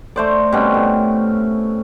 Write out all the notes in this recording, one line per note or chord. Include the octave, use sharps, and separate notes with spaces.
A3 C5 D5
B2 G3 C4 C#4
A2